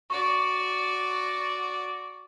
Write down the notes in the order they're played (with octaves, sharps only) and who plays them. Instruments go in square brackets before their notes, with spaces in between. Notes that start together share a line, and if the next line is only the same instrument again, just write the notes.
[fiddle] F#4 D5 [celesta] C#6